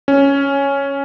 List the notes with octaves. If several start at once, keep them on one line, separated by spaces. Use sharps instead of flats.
C#4